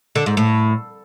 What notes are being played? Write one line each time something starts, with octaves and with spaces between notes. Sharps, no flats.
D3
G#2
A2